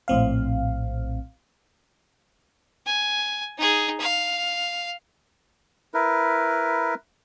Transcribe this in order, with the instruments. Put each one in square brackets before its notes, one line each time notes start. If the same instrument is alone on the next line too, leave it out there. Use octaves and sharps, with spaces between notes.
[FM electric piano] A#1 A2 C4 F5
[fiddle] G#5
D#4 G#4
F5
[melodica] E4 A#4 B4